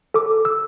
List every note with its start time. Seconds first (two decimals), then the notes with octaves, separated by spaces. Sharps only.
0.14 A4 D6
0.45 E6